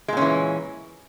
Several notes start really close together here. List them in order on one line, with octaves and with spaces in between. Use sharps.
G#3 A#2 C#4 E3